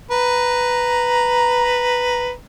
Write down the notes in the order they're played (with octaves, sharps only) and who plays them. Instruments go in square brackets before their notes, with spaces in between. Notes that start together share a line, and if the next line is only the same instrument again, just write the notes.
[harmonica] B4 A#5